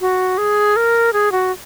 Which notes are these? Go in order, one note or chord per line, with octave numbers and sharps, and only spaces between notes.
F#4
G#4
A#4
G#4
F#4